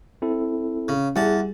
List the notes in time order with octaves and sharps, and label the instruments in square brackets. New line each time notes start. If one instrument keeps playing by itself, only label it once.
[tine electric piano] C4 E4 A4
[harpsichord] C#3
[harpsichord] E2 A5 [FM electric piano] G3 G#4 [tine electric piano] F#5